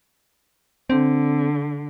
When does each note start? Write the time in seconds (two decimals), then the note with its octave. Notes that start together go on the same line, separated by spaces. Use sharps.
0.90 D3 C4